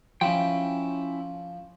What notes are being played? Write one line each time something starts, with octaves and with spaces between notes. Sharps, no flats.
F3 C#4 E4 G5